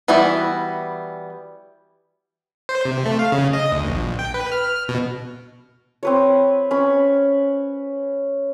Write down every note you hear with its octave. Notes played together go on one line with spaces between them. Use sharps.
E3 G3 B3 E4 F#4
C5
C3
A3
F5
C#3
D#5
D2
A#1
G5
B4
F6
B2
C4 B4 C#5
C#4 B5